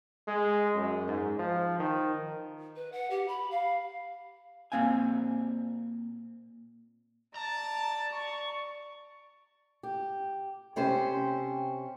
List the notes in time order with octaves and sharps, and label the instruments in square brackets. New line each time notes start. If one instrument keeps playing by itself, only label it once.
[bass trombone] G#3
F#2
G#2
F3
D#3
[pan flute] B4
F#5
G4
B5
F5
[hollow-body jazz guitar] A#2 E3 A#3 C4 F5 G#5
[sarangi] D5 [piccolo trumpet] A5 [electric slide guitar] A#5
[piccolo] C#6
[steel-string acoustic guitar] G4
C3 C#4 G4 C5